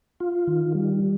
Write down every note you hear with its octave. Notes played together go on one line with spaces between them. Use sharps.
F4
D#3
G3